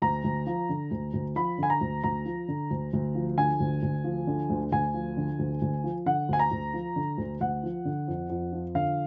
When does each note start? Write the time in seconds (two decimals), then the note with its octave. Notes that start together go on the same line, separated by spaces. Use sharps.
0.02 D2 A#5
0.24 D2
0.47 F3
0.69 D3
0.91 D2
1.14 D2
1.36 F3 B5
1.58 D3 G#5
1.70 A#5
1.81 D2
2.04 D2 A#5
2.26 F3
2.49 D3
2.71 D2
2.93 D2
3.15 F3
3.38 D3 G#5
3.60 D2
3.83 D2
4.04 F3
4.27 D3
4.50 D2
4.72 D2 G#5
4.94 F3
5.17 D3
5.39 D2
5.62 D2
5.84 F3
6.06 D3 F#5
6.29 D2 G#5
6.39 A#5
6.51 D2
6.74 F3
6.96 D3
7.18 D2
7.41 D2 F#5
7.63 F3
7.85 D3
8.08 F2
8.30 F2
8.53 F3
8.75 D3 F5